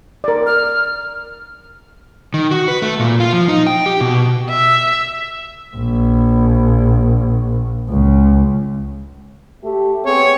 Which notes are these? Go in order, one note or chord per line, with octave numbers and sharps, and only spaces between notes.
A#4 D5
F6
D#3
F#4
B4
A3
A#2
F4
F3
D#4
G5
G4
B2
E5
A#1
C#2
A3 G4
B3 C4 G#4 C#5